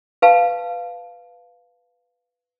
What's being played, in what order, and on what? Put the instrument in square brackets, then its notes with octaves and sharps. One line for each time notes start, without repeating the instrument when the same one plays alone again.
[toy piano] B4 F5 A5